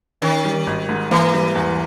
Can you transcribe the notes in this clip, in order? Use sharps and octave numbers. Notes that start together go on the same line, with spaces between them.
D#3 C#4
G3
G#1
G#2
E3 A#3
G3
E2